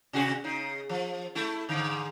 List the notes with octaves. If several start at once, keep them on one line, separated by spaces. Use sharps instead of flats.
C3 F#4 G#4
C#3 D#4
F3
A3 E4
G#2 D3